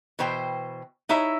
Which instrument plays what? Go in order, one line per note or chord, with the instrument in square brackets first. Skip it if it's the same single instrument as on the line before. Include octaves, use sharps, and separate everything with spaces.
[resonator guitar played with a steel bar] B2 E3 C5 G5
D#4 E4 C#5 E5